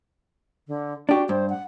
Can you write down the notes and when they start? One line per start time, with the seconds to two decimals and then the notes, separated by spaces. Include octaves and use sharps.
0.68 D3
1.09 D4 F#4 G4
1.29 G2 C5
1.49 F#5